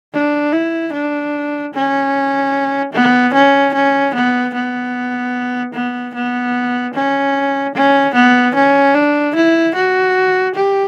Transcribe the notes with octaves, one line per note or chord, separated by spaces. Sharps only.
D4
E4
D4
C#4
B3
C#4
C#4
B3
B3
B3
B3
C#4
C#4
B3
C#4
D4
E4
F#4
G4